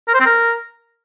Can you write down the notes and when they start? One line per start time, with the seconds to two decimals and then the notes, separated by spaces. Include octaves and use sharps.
0.08 A#4
0.14 C5
0.20 C4
0.26 A#4